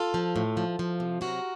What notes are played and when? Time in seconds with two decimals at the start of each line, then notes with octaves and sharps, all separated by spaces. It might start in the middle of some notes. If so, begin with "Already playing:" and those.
Already playing: F4 A4
0.14 F3
0.36 A2
0.57 F3
0.79 F3
1.00 C3
1.21 F#3 F#4 A#4